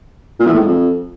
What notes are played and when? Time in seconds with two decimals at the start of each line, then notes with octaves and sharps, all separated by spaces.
0.40 A#2
0.46 E2
0.53 A2
0.60 G#2
0.66 F2